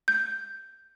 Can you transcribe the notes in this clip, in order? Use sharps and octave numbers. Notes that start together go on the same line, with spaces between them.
G6